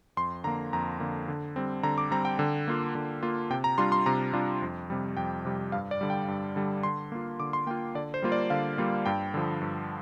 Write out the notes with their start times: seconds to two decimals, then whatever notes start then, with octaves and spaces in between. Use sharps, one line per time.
0.17 F2 C6
0.44 D3 A#3 A#5
0.73 F2 A#5
1.00 D3 A#3
1.28 D3
1.56 G3 C4
1.83 D3 A#5
1.98 D6
2.11 G3 C4 A#5
2.25 G5
2.39 D3
2.68 A#3 F4
2.95 D3
3.23 A#3 F4
3.50 C3 G5
3.64 A#5
3.78 G3 D4 F4 C6
3.92 C6
4.06 C3 A#5
4.33 G3 D4 F4
4.62 F2
4.90 C3 G3
5.17 F2 G5
5.45 C3 G3
5.72 G2 F5
5.91 D5
6.01 D3 G3
6.10 G5
6.28 G2
6.56 D3 G3
6.83 D3 C6
7.12 A#3 F4
7.40 D3 D6
7.53 C6
7.67 A#3 G5
7.71 F4
7.95 D3 D5
8.14 C5
8.22 G3 A#3 F4
8.32 D5
8.50 D3 F5
8.78 G3 A#3 F4
9.06 G2 G5
9.34 D3 F3
9.62 G2